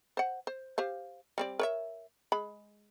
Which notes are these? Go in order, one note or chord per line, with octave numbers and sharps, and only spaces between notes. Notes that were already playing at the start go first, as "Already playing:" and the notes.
C5 F#5
C5
G4 C5 F5
G3 C4 D5
A#4 C#5 E5
G#3 B5